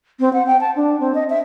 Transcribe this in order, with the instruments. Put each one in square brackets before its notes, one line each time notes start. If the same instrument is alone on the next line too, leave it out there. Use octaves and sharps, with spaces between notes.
[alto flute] C4
F#5
G5
A5
D4
C4
D#5
E5